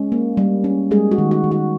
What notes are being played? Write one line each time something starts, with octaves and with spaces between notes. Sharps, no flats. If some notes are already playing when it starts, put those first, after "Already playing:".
Already playing: G#3 C#4
A#3
G3
C#4
G3 G#3 G#4
F#4
D#3
F#4
D#3
F#4